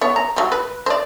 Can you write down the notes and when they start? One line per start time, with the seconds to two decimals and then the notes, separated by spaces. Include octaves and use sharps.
0.01 B3 C#5
0.16 A#5
0.36 F#3 G3
0.52 B4
0.86 C5 D5